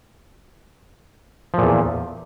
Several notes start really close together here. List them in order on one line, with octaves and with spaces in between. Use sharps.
F3 A#2 E2